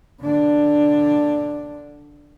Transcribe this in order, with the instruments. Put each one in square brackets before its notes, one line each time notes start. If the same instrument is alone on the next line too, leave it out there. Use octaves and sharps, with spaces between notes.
[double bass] D3 D4